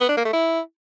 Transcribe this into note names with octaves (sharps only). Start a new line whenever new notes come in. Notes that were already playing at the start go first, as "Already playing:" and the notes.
B3
D4
A#3
A3
E4